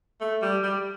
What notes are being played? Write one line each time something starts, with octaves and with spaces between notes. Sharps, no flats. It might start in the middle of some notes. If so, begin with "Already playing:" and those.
A3
G3
G3